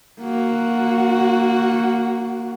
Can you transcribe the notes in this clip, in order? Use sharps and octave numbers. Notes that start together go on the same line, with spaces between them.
A#3 F#4